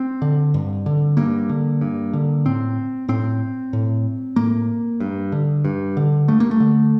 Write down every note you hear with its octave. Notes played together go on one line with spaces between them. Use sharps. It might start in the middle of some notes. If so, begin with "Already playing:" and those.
Already playing: C4
D3
G2
D3
G2 A#3
D3
G2
D3
A2 C4
A2 C4
A2
A2 A#3
G2
D3
G2
D3
G2 A3
A#3
A3
D3